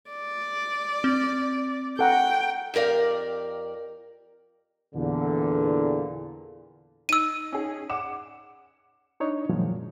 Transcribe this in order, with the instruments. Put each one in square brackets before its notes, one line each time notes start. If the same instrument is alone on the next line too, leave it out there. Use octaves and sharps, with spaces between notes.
[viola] D5
[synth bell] C4
[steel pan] A4 F#5 A#5 [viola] G5
[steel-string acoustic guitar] F2 G4 A#4 D5 F5
[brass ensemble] E2 A#2 D3
[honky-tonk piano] D#4 [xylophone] E6 D#7
[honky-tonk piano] C#4 D#4 G#4
F#5 D6 E7
[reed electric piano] D4 D#4 C#5
F#2 A#2 D#3 F3 F#3 G#3